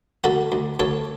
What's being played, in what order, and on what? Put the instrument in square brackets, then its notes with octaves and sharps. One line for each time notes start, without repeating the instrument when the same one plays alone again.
[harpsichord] D2 F#4 A4
D2
D2 A4 C#5